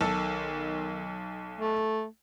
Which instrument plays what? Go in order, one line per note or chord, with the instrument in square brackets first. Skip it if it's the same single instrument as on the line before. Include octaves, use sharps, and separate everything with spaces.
[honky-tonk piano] B1 A4 [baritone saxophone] D#3
[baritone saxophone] A3